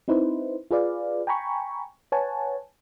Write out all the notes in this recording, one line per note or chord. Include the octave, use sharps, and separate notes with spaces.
C4 D#4 E4 B4 C5
F4 G#4 B4 D5 F5
G5 G#5 A#5 B5 C#6
B4 C#5 F#5 G#5 A5